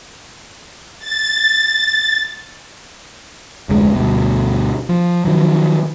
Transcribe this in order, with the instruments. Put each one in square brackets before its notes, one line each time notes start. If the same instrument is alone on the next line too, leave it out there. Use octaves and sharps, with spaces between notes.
[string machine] A6
[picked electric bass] F1 D2 G#3
D2 G2 B2
F3
D#3 F3 F#3